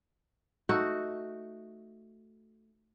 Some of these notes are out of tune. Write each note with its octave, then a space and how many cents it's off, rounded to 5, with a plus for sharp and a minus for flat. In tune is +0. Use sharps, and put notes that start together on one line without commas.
A3 +0 D#4 +0 F#4 +0